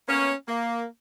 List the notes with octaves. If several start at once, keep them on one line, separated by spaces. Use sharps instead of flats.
A#3 B3 C#4
A#3